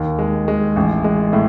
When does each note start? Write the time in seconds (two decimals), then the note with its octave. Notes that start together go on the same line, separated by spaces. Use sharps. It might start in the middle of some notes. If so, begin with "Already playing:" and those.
Already playing: D#2
0.19 G#3
0.48 G#3
0.76 A1
1.04 G#3
1.33 A2